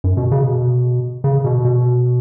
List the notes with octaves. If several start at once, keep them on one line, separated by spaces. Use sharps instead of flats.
F#2
B2
C#3
B2
C#3
B2
B2